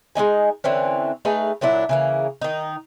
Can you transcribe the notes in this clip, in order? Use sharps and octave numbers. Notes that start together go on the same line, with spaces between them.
G#3 C4 D#4 G#5
D3 E3 C4 C#4
A3 D#4 G#4 B4
A#2 F#3 D4 E4
C#3 E3 A#3
D#3 D#4